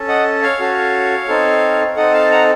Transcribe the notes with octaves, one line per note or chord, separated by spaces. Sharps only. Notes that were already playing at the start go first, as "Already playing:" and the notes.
Already playing: C#4 A4
D#5 F#5
C#5 F5
C#4 F#4 A4
C4 D#4 A4
C4 D#4 A4 D#5 F#5
F5 A5
F#5 A#5